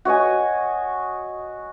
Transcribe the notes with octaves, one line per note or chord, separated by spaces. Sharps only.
F#4 C#5 D#5 G#5